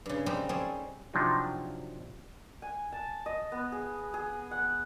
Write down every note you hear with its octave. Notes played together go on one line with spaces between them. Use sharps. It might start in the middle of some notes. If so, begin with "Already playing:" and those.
G2 C#3
C#3 G3 C4 D#4 G4
G3 C4 C#4 G#4 A4
C3 F3 F#3 D4 D#4
G#5
A5
D#5
B3
G#4
G#4
F#5